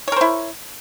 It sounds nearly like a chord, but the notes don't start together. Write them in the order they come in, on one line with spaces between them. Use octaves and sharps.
C#5 A#4 C5 E4